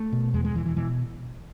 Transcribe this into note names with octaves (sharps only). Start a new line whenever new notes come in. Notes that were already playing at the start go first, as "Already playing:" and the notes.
Already playing: A3
B2
E2 G#3
G#3
E1 E3
E3
B2 E3